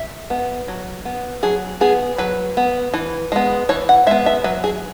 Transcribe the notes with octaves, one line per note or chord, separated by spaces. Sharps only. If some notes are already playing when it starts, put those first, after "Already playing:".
Already playing: E5
B3
F#3
B3
F#3 G#4
B3 G#4
F#3 B4
B3
E3
G#3 B3
E3 C#5
F#5
G#3 B3 E5
E5
F#3 B4
G#4